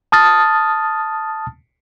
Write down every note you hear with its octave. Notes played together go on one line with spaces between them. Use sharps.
A5 D#6 F6 A6